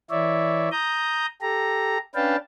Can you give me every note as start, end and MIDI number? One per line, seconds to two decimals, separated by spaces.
0.10 0.69 52
0.10 0.69 64
0.10 0.69 73
0.10 0.69 74
0.10 0.69 76
0.72 1.26 82
0.72 1.26 87
0.72 1.26 91
1.42 1.98 67
1.42 1.98 69
1.42 1.98 82
2.15 2.36 61
2.15 2.36 62
2.15 2.36 71
2.15 2.36 77
2.15 2.36 79
2.15 2.36 81